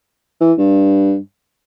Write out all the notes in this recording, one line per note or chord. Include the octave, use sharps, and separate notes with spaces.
E3
G2